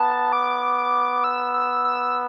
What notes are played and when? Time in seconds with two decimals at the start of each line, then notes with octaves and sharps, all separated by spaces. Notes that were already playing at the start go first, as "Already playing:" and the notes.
Already playing: B3 A5
0.33 D6
0.78 D6
1.24 E6
1.54 E6
1.85 E6